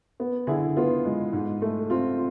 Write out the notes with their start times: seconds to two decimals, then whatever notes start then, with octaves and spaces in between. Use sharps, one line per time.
0.20 B3
0.47 D3 E4 G#4
0.77 B3 F4
1.05 G#3
1.33 G#2
1.62 A3
1.90 C4 F4